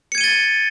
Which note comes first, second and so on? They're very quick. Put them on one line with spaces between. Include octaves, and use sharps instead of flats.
C#7 G#6 D#7 G7 A6